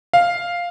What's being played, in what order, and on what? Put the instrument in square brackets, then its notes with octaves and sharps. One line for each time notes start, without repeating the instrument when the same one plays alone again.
[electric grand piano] F5